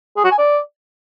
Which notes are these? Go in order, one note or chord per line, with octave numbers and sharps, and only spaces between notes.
G#4
F#4
G#5
D5